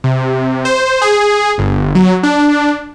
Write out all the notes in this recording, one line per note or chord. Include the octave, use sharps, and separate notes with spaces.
C3
C5
G#4
G1
F#3
D4